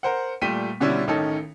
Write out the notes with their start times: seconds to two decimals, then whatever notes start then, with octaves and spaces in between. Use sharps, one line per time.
0.03 A#4 C5 F#5
0.42 A#2 G3 A3 G5 B6 D#7
0.80 B2 D3 G3 C#4 D4 E4
1.07 A1 D#3 C#4 D#4 A4